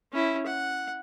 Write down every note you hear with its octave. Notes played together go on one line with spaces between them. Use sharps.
C#4 E4
F#5